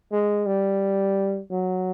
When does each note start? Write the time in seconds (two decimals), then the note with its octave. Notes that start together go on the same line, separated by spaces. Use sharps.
0.12 G#3
0.46 G3
1.51 F#3